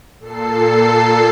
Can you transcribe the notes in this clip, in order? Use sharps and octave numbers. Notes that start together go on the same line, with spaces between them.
A#2 A4 C7